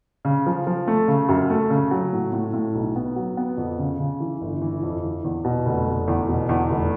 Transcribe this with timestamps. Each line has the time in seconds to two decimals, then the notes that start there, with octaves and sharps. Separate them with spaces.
0.25 C#3
0.46 F3
0.67 F3
0.88 A3
1.08 C#3
1.29 F#2
1.50 A3
1.70 C#3
1.91 F#3
2.13 A2
2.33 A2
2.53 A2
2.75 B1
2.96 B3
3.16 F#3
3.37 B3
3.57 F2
3.79 C#3
3.99 C#3
4.20 E3
4.41 G1
4.62 E3
4.83 F2
5.03 E3
5.24 E2
5.44 B2
5.66 F1
5.87 F1
6.08 E2
6.28 B2
6.49 E2
6.70 F1